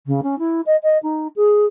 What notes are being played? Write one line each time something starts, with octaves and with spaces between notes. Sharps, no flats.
C#3
C#4
E4
D#5
D#5
D#4
G#4